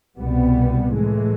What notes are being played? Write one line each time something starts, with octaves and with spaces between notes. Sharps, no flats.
C2 B2 G3 B3
A2 E3 G#3